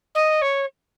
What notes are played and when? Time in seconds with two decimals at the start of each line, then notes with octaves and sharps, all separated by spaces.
0.15 D#5
0.41 C#5